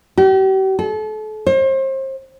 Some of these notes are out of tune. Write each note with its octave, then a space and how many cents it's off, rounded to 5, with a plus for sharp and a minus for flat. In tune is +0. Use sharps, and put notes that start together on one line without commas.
G4 -40
A4 -35
C5 +35